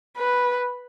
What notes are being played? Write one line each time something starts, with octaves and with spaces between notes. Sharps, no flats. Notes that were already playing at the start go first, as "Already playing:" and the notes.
B4